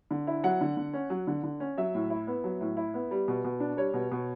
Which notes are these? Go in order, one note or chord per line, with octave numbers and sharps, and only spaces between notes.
D3
E4
F#3 F#5
D3
D3
C#4
F#3
D3
D3
C#4
F#3 E5
A2
E4
B3
F#3
A2
E4
B3
G3
B2
B2
D4
G3 C#5
B2
B2